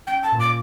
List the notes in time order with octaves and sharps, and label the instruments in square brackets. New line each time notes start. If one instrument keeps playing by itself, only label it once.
[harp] C#4 [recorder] G5
[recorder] A5
[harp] A#2
[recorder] D6